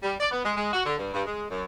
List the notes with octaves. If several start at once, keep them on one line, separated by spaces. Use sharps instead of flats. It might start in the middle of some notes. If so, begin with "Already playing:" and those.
G3
D5
B3
G#3
G#3
F#4
D3
G2
G2
G#3
F#2